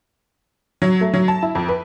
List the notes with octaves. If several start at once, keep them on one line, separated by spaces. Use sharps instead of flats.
F#3
A3
F#3
A5
E4
F2
B4